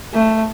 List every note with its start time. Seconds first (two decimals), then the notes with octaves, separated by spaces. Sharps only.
0.14 A3